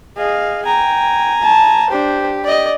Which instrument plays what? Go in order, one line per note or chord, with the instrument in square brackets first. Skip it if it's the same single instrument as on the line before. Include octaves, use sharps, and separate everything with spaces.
[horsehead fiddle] G#4 D#5 [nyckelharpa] F5
[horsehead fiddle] G5 [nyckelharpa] G#5 A#5
[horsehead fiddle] A5
[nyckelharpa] D4 C5 [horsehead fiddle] G4
[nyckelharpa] D5 D#5